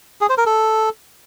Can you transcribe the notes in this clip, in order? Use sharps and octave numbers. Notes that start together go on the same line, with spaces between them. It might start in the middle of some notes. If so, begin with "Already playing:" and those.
G#4
C5
A#4
A4